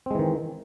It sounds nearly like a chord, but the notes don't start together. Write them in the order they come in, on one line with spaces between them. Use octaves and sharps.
C4 G#3 E3 D#3